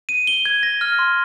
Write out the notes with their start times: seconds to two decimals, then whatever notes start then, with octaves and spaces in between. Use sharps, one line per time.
0.09 D#7
0.27 G7
0.45 G#6
0.63 A#6
0.81 F6
0.99 C6